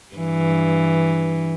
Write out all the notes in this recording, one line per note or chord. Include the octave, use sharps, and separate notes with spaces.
G2 E3